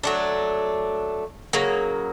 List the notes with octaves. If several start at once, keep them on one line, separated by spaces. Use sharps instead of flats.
F#3 A3 D4
C#3 F#3 A#3